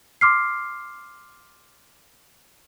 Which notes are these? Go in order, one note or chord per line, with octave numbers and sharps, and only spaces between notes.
C6 D6 F6 C7